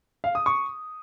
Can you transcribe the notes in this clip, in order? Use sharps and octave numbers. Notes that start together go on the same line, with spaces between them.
F5
D#6
C#6